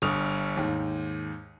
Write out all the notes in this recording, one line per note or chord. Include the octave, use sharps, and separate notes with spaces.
G1 G2 C#6 D#6 F6 F7
D#2 G#2